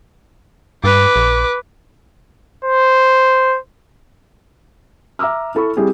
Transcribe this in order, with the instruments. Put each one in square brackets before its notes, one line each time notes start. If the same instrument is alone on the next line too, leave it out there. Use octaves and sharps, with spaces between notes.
[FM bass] G2 [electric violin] B4 D6
[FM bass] A#1
[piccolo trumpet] C5
[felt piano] E5 A#5 D6 E6 F6
E4 A4 B5 C#6
G3 C4 E4 G4 G#4